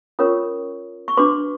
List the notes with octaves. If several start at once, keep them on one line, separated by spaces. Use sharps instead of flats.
C#4 F4 A#4 C#5 C#6 D#6
C#6
D4 F#4 B4 C6 D6